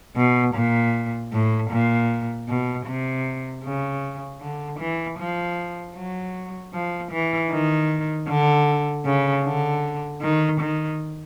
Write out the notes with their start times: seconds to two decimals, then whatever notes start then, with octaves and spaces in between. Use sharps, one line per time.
0.16 B2
0.54 A#2
1.32 A2
1.70 A#2
2.48 B2
2.86 C3
3.64 C#3
4.41 D3
4.80 E3
5.18 F3
5.96 F#3
6.73 F3
7.12 E3
7.51 D#3
8.29 D3
9.05 C#3
9.44 D3
10.22 D#3
10.60 D#3